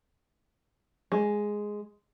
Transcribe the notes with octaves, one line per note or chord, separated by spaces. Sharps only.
G#3